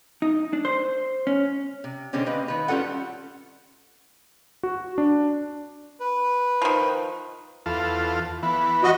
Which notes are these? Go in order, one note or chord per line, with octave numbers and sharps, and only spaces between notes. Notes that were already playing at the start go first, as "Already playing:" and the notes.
D#4
D4
C5
C#4
C3
B2 D3 G#3 C4 C#4 G4
A#3 C4 B4 D#5
D#3 B4
G3 C#4 F4 A4 F#5
F#4
D4
B4
D#3 F3
E2 F4 A4
E3 B3
F#4 D#5